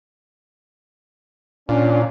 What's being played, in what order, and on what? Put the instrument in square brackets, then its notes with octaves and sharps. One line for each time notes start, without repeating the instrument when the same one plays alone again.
[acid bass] A#2 [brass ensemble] C#4 [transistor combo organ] D4 F4